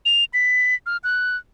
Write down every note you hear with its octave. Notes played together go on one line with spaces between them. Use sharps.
F7
B6
F6
F#6